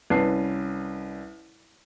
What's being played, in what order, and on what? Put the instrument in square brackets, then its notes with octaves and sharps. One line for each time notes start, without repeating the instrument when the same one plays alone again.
[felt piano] C2 C#4 B4 A5 C7